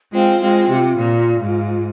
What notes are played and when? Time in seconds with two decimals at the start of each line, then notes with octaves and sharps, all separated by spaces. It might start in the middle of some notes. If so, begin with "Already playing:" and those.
0.13 G#3 C4 F4
0.42 G#3 C4 F4
0.70 C3 F4 G4
0.99 A#2
1.41 G#2